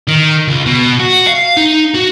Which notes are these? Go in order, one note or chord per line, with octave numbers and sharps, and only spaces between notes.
D#3
C#2
B2
F#4
F5
D#4
F#4